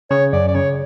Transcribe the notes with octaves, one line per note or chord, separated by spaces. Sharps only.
C#3 C#5
F#2 D5
D5
C#3 C#5